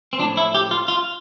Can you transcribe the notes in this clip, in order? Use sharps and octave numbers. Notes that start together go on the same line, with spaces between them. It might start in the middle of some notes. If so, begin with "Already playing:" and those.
C4
A2 F3 D4
E4
G4
F4
F4